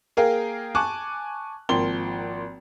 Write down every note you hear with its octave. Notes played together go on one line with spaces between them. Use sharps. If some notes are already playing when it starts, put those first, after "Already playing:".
A#3 G#4 A#4 F5 G5
G#5 A5 C#6 D6 F#6
G#1 F3 A#3 G5 C6 G7